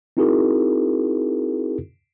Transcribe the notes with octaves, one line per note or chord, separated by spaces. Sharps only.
C4 D#4 E4 F#4 G#4 A#4